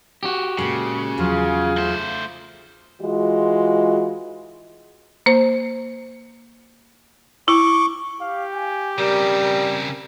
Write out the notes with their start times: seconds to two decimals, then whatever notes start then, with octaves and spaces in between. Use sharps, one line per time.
0.23 F#4 G4
0.58 A#2 C#3 G#3
1.18 E2 F3 F#3 F4 G#4
1.77 A3 C5
3.01 E3 G#3 F4 F#4
5.26 A#3 C5
7.48 E4 C#6 D6
8.20 G4 F5
8.53 G#5
8.98 C#3 G3 C4 A#4
9.43 A#4